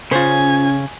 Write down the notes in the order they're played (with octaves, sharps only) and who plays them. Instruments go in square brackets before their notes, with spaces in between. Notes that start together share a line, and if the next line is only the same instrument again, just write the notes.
[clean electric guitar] C#3 [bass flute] C#4 [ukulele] F4 C5 [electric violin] G#5